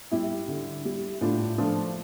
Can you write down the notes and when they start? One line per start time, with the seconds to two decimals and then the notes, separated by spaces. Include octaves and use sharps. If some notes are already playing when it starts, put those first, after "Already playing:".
0.11 G3 E4 G4
0.48 D3
0.85 G3
1.21 A2 D4 F4
1.58 F3 A3 D4 F4